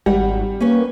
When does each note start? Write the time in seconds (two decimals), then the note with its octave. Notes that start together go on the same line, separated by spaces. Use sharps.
0.06 G#1 G3 F#5
0.60 A#3 C#4 B4 C#5